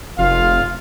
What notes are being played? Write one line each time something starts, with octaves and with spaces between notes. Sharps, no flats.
F1 F4 F5